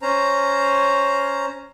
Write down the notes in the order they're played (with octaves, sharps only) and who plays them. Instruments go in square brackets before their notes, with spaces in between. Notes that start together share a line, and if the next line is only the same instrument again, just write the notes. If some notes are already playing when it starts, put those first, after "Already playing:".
[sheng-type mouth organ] C#4 C5 A#5